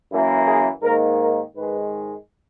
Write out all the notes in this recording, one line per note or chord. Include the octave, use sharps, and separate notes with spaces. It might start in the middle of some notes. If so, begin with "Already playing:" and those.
F#2 E3 A#3 E4
G#4
G#2 D#3 A#3 A#4
A#4
G#2 D#3 G#3 B4